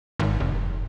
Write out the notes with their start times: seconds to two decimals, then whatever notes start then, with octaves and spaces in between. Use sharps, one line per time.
0.19 G#1
0.40 F1